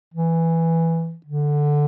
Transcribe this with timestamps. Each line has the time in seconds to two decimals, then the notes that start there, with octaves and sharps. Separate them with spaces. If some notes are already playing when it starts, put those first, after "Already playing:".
0.14 E3
1.26 D3